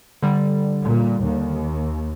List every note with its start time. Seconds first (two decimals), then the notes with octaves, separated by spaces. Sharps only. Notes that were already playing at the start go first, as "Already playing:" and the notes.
0.22 D3 G3
0.83 A#2
1.22 D#2